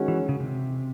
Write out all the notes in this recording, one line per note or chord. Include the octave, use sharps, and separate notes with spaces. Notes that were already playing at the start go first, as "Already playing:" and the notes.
Already playing: D#3 G#3 C#4 F#4
E3
C#3
C3